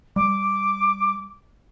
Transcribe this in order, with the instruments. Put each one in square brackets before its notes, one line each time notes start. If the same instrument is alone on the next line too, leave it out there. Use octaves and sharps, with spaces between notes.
[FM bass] G3 [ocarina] D6